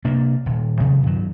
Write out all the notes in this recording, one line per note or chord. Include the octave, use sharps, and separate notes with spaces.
C3 A#3 D4
D#1
C3 D#3 F3 F#3
G2 D#3 F#3